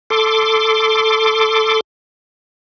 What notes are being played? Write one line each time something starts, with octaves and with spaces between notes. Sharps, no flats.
A4 C6 D6